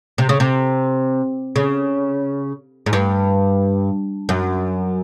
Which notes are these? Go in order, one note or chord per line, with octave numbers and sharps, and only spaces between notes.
C3
C#3
C3
C#3
G#2
G2
F#2